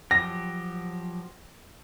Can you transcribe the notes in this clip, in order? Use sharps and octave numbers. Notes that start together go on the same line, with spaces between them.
F3 F#3 G4 A#6